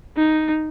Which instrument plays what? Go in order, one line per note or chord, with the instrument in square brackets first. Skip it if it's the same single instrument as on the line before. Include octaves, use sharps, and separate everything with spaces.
[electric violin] D#4